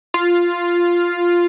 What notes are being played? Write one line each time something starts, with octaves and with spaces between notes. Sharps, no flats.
F4